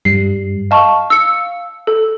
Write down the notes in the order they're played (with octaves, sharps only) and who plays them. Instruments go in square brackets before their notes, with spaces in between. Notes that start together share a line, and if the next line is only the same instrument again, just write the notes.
[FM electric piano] G2 G3 [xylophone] C7
[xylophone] D#5 A5 C#6 [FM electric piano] F5
[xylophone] E6 C#7
A4